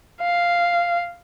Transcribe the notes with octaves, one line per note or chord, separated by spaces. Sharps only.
F5